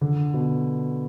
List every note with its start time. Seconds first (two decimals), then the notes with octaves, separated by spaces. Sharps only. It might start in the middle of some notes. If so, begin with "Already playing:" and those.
0.01 D3
0.34 B2